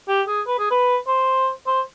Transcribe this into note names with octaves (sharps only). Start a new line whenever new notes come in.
G4
G#4
B4
G#4
B4
C5
C5